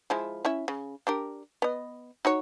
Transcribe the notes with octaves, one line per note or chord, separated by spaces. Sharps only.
F3 G#3 E4
C#4 E4 E5
C#3
D4 G4 A#4
B3 D#5
D#4 F#4 C#5